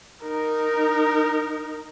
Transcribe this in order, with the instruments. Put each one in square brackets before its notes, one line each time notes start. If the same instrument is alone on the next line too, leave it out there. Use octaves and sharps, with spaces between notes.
[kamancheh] D#4 A#4